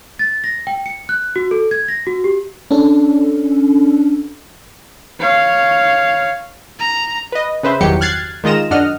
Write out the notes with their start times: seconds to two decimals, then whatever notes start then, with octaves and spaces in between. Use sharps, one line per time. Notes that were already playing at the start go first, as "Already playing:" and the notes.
0.19 A6
0.44 A#6
0.67 G5
0.86 C#7
1.09 F#6
1.36 F#4
1.51 A4
1.71 G#6
1.88 A#6
2.07 F#4
2.24 G4
2.71 C#4 D4 A4
5.20 C#5 F5
6.79 A#5
7.32 B4 D#5
7.63 C#3 B4 C5 E5
7.81 G1 E2 D#3 F#3 G4 C#7
8.01 F6 F#6 G#6 A6 C7
8.44 D#3 G#3 F4 D#5 A#5 E7
8.71 F#2 D4 D#5 F#5 F6